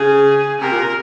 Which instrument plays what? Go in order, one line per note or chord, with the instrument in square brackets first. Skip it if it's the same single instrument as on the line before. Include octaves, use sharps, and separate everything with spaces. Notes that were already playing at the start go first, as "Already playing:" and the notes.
Already playing: [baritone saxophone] C#3 [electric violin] G#4
[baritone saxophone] C3 [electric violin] A#4
[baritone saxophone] A#2